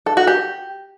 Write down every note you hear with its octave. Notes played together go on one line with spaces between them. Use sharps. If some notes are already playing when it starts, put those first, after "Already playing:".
A4
F#4
G4